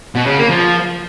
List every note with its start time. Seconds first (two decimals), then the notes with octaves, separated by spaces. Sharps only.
0.15 B2
0.26 C#3
0.38 A#3
0.49 F3